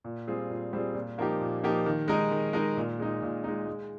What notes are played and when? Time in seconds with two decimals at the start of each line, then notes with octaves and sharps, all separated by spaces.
0.04 A#2
0.28 G3 C4 F4 G#4
0.50 A#2
0.73 G3 C4 F4 G#4
0.94 A#2
1.18 F3 A#3 D#4 G4
1.41 A#2
1.64 F3 A#3 D#4 G4
1.86 D#3
2.08 G#3 D#4 A#4
2.31 D#3
2.53 G#3 D#4 A#4
2.77 A#2
2.99 G#3 D#4
3.22 A#2
3.44 G#3 D#4
3.67 G#3